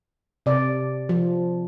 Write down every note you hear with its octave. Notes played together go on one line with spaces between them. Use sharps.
C3 D5
F3